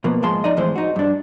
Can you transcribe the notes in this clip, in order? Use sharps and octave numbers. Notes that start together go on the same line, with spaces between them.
B2 F3 A#3 B3
G#2 F3 G#3 A5 C6
D#4 D5 D#5
F2 A2 E3 G#3 C5
D#4 F#4
G2 D4